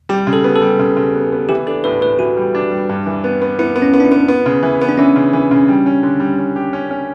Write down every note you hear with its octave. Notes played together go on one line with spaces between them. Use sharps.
G3 G4
C#3
A4
B3
A4
G3
C#3
C#3
B3
B3
E3 G4
D4 A4
A2 B4
A2 B4
E3 F#4
G3
D4
G3
G2
E3
B3
B3
B3 E4
B3
C#4
B3
D4
E4
B3
B3
C#3
E3
B3
D4
E3 C#4
C#3
E3
C#3
G3
C#4
D3
G3
C#4
G4
C#4
C#4